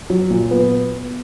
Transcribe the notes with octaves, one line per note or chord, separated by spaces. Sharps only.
F#3
A#2
B3